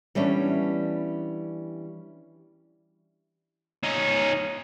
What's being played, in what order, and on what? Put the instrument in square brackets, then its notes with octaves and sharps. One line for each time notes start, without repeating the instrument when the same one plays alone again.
[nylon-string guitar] E3 G3 B3 C#4 D4
[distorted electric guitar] C#4 D#4